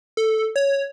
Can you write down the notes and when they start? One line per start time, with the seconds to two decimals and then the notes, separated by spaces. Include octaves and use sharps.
0.17 A4
0.56 C#5